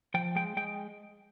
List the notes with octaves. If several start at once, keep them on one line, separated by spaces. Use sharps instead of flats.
F3 G5
G#3 G5
G#3 G5